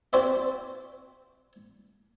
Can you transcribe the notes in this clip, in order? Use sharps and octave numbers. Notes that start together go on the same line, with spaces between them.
C4 F#4 C5 D5 E5